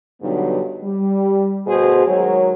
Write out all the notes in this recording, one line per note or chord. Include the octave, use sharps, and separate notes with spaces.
G2 B2 D3 F#3 B3 D#4
G3
D2 B2 F#4 G#4 C5
D#3 F#3 G#3 F#4 A#4 C#5